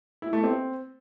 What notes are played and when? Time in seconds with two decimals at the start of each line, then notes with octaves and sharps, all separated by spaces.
0.22 E4
0.33 A3
0.44 C4